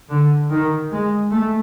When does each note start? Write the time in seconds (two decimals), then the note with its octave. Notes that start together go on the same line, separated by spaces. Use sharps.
0.11 D3
0.51 D#3
0.91 G#3
1.31 A3